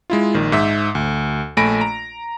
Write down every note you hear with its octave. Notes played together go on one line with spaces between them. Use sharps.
G#3 E4 F4
A#1 D#3
G#2 E5
D2
A#1 A3 G#5 B5 A#6 D7
A#5